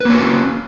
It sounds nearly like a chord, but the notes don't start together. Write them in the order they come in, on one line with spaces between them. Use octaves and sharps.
B4 A#3 C#5 F#4 C#4